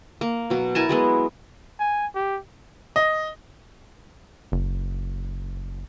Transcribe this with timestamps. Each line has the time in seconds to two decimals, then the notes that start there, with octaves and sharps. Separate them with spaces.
0.21 A#3
0.50 B2 F#3
0.75 E4 A#4 G#5 A5
0.89 F#3 G#3 B3
1.79 G#5
2.15 G4
2.96 D#5
4.52 F#1